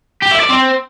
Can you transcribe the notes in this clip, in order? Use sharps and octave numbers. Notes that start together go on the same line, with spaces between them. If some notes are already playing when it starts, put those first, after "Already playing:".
G4
E4
D5
C4